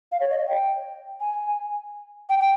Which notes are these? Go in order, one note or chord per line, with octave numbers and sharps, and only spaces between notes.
F5
C#5
D#5
G5
G#5
G5
G5